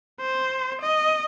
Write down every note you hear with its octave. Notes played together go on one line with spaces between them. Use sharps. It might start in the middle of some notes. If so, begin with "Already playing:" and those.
C5
D#5